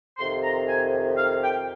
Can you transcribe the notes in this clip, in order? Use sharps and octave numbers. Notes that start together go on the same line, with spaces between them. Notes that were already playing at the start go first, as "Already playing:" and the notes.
F2 C3 D#3 C6
A#5
G#5
F5
G5